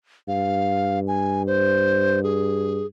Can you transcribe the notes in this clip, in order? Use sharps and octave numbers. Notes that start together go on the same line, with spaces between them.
G2 F5
G#5
C5
G#4